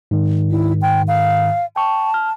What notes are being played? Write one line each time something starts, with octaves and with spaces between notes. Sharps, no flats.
G#2 D#3
E4
G5
F5
G5 A5 C#6
F6